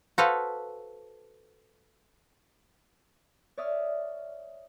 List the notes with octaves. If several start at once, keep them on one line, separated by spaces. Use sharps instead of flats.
F#4 A4 B4 C5 F5
C#5 D5 E5 D#6 F6